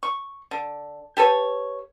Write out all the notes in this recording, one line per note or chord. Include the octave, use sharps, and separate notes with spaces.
C#6
D3
G4 A4 B4 C#5